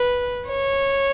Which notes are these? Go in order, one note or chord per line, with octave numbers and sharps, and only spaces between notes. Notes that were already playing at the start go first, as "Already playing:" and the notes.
Already playing: B4
C#5